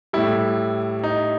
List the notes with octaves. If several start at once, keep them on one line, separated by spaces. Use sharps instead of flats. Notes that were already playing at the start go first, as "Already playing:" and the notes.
A2 G3 E4
D#4